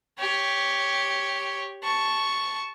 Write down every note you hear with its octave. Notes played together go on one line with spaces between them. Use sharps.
G4 C#5
A5 C#6